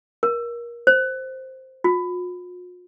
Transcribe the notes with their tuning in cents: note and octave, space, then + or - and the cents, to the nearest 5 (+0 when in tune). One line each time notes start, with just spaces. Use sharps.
A#4 +25
C5 +0
F4 +45